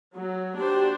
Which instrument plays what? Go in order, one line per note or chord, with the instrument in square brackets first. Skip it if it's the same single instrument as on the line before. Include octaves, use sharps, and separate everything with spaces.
[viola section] F#3
[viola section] D4 F#4 C5 [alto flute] G4